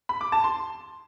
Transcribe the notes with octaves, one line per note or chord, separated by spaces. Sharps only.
B5
D6
A5
C6